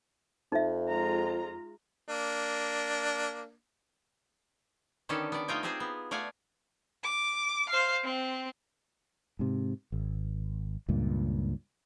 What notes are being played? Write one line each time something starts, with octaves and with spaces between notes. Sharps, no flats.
F2 D#4 E5
G#3 F4 A#5
A#3 D4
D3 D#3 B3 C#4 G4 A4
B3 D5
A3 D#4 F4 D#5 G5 G#5
C4 F4 G4 G#4 C5
B3
A3 D5 F5 F#5 G#5
D6
C5 F5
C4
G#2 C3
G#1
C#2 G2 A#2